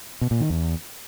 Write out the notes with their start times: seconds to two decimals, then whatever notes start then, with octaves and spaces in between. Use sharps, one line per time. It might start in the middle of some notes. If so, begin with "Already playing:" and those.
0.21 B2
0.31 A#2
0.40 D#3
0.50 E2